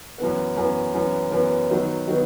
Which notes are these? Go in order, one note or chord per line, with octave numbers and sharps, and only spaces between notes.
F#2 E3 B3
F#2 E3 B3
F#2 E3 B3
F#2 E3 B3
D#3 F#3 B3
D#3 F#3 B3